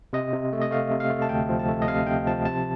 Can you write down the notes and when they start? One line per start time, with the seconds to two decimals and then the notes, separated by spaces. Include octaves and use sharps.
0.13 C3 D#5
0.33 C3
0.53 A3
0.61 D#5
0.71 A3 F5
0.91 C3
1.00 F5
1.10 A3
1.22 A5
1.29 D2 G5
1.49 F3
1.59 A5
1.68 A3
1.82 D#5
1.88 C3 F5
2.07 C3 G5
2.27 F3 A5
2.45 C3 A5